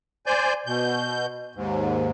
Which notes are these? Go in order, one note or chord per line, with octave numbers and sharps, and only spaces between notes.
C5 D5 G#5 G6
B2 G6
D#2 G#2